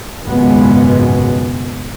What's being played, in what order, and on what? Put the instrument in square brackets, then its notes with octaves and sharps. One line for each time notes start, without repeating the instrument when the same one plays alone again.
[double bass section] G#1 C#2 F#2 B2 G#3 B3